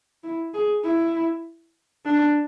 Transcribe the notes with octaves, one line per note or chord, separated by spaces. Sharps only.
E4
G#4
E4
D4